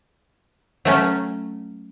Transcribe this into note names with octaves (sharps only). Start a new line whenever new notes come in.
F#3 A3 C#4